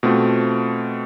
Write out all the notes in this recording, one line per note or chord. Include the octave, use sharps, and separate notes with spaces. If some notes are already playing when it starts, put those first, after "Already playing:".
B2 A3 C4 F4